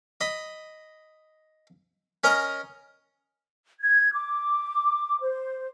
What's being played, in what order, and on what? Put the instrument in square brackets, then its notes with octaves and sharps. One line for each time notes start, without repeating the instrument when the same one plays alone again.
[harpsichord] D#5 B5
C#4 A#4 D#5 A#5
[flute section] G#6
D6
C5